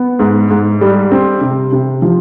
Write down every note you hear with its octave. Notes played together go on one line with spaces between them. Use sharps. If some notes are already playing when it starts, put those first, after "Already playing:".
Already playing: B3
G#2
G#2
G3
C4
C3
C3
F3